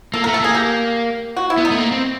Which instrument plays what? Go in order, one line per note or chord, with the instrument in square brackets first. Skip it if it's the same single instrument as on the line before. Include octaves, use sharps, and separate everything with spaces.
[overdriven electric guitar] A#3 [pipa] A4
[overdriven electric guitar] A3 [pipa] A#4
[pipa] A4
[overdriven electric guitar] A#3 [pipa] G#4
[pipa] G4
F#4
E4
[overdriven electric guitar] B3
[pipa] D#4
[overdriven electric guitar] A3
A#3
C4